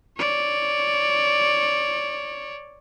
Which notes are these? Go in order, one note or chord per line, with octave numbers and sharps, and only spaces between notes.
C#5 D5